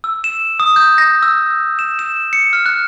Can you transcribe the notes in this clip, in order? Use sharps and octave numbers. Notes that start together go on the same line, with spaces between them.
E6
E7
D#6
G6
A#6
E6
E7
E7
C#7
F6
F#6